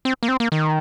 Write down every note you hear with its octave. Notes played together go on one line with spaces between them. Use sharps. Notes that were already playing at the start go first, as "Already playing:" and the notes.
C4
A#3
C4
A#3
D#3